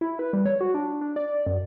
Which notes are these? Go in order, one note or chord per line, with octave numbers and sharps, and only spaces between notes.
E4
B4
G3
C#5
F#4
D4
D4
D5
F#2